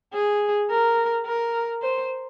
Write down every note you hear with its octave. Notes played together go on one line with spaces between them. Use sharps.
G#4
A#4
A#4
C5